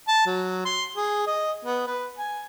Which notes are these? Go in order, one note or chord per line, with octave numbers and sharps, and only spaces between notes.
A5
F#3
C6
G#4
D#5
B3
B4
G#5